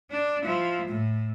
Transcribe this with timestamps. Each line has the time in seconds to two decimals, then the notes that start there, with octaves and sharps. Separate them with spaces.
0.10 D4
0.44 F3 E4
0.88 A2